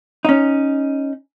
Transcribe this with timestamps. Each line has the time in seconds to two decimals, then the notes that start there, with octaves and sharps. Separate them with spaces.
0.25 C#4 D#4